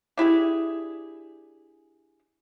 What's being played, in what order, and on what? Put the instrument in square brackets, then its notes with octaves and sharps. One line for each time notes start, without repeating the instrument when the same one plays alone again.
[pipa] D4 E4 G4 G#4